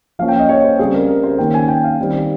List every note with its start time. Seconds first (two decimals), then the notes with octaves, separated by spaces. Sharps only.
0.19 F3 A#3 C#4 F5
0.28 G5
0.40 D#5
0.49 C#5
0.64 C5
0.79 C#3 G3 C4 G#4
0.94 A#4
1.08 A#4
1.23 C5
1.38 D#3 A#3 C#4 G5
1.54 G#5
1.68 G5
1.84 F5
1.99 D#3 G3 C4